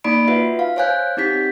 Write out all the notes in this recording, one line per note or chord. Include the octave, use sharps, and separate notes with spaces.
A#3 D#4 D5 B5 D7
F4 F#4 B4 E5
F5
C5 C#5 F5 G#5 F#6 G6
C4 D#4 G4 G6 B6